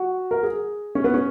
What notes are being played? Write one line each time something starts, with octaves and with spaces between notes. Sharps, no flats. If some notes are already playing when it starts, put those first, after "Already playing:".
Already playing: F#4
A#4
G#4
C#4
B3
C#4